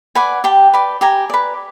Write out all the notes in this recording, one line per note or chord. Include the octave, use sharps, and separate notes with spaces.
B4 D5 F#5 G#5
G4 G5 A5
B4 D5
G4 G#5 A#5
B4 D5